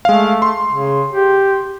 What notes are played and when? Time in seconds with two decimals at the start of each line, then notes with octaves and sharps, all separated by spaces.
0.05 G#3 A3 F5
0.42 C6
0.72 C#3
1.12 G4